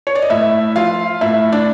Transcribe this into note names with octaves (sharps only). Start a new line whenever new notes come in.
C#5
D5
D#5
A2 E4 E5
F3 F4 F5
A2 E4 E5
D4 D5